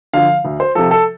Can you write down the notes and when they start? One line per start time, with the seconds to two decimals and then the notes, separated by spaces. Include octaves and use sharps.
0.13 D3 F3 F5
0.45 D2
0.60 C5
0.75 C3 F3 A4
0.91 A4